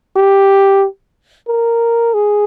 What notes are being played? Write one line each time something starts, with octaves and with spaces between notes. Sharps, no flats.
G4
A#4
G#4